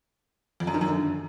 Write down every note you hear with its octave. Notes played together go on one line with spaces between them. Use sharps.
F2
F#2
D#3
F#2
D3